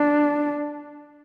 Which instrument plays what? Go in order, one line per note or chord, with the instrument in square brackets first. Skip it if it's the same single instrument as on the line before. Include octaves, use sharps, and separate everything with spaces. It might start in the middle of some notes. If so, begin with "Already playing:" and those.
Already playing: [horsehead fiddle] D4